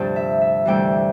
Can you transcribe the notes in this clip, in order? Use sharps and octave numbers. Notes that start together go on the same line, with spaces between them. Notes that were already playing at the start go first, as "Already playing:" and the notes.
Already playing: D2 G2 C3 F3 G5 A5
E5
E5
D2 C3 E3 G3 G5